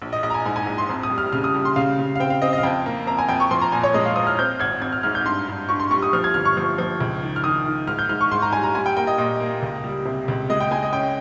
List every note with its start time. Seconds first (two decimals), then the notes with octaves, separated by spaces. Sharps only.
0.02 A#1
0.13 D#5
0.23 A#1 D#5
0.30 A#5
0.34 G#5
0.45 G#2 G#5
0.56 G#5
0.67 A#1
0.78 C6
0.89 F2
1.03 D#6
1.10 G3
1.18 F6
1.32 C#3 F6
1.44 D#6
1.55 G3
1.65 C6
1.76 C#3 F5
1.99 C#3
2.16 F5
2.20 C4 G5
2.30 F5
2.42 C4 D#5
2.53 D#5
2.58 F5
2.63 F2 G5
2.86 A#3
3.07 F2 A#5
3.19 G#5
3.28 F2 G5
3.40 C#6
3.51 F3 C6
3.62 A#5
3.72 A#2 G#5
3.83 C#5
3.94 G#3 D#5
4.06 F5
4.16 F3 D#6
4.27 F6
4.39 C4 G6
4.60 G#1 G#6
4.82 G#1 G#6
4.92 F6
5.03 G#2 F6
5.15 G6
5.25 G2 C6
5.48 G2
5.69 G2 C#6
5.80 C6
5.91 G3 C#6
6.02 D#6
6.13 F3 F6
6.24 G#6
6.34 G1 F6
6.45 C#6
6.57 F3
6.78 F3
7.01 C#2
7.22 D#3
7.36 F6
7.44 D#3 D#6
7.66 D#3
7.87 G#2 F6
7.99 G6
8.09 G#2 F6
8.21 C#6
8.31 G#2 C6
8.42 A#5
8.52 G3 G#5
8.63 A#5
8.75 G3 G#5
8.86 G5
8.97 A#3 G5
9.07 D#5
9.18 A#2 D#5
9.40 A#3
9.62 C#2
9.84 G3
10.05 C3
10.28 C#2
10.50 G#3 D#5
10.60 G5
10.71 G#3 G#5
10.83 D#5
10.93 C#4 G5